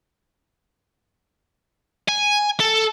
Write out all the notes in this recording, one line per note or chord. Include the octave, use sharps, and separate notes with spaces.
G#5
A4